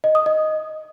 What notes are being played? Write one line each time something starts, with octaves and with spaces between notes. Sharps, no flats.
D#5
D#6
D#5